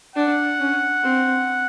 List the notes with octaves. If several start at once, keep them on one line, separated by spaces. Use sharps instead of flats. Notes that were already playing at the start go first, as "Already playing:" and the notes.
D4 F#5
C#4
C4